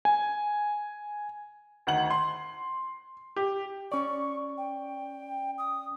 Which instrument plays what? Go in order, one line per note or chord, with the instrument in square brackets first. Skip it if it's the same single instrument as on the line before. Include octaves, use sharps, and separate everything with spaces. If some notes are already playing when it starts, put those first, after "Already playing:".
[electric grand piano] G#5
[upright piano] D2 D#3 F#5 F#7
C6
G4
[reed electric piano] C#4 D5 [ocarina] C#6
[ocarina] G5
D#6